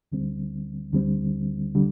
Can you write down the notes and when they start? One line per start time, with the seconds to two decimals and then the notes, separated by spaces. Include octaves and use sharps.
0.12 D2 D3 G3 C4
0.93 D2 D3 G3 C4
1.75 D3 G3